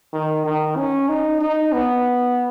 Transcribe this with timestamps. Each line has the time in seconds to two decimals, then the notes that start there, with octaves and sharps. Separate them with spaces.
0.13 D#3
0.45 D#3
0.77 C#4
1.09 D#4
1.41 D#4
1.73 B3